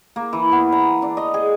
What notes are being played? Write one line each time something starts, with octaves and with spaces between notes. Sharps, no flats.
A#3
E3
B3
A#5
D4
D#5
G#4